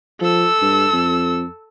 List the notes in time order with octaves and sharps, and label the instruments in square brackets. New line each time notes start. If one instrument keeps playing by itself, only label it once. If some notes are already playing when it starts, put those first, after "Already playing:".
[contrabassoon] F3 [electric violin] A4 E6
[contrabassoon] G2
F2